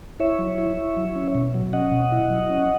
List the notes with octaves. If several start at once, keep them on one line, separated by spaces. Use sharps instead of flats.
E4 C#5 E5
F#3
E4
E4
F#3
C#4
B2
F#3
C#4 D#5 F#5
B2
E4
F#3
C#4